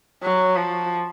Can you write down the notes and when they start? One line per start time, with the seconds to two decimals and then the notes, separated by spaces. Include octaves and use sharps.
0.23 F#3
0.57 F3